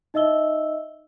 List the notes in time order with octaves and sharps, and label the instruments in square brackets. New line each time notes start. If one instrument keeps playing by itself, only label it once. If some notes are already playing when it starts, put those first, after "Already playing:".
[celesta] D#4 D#5 E5 E6 G7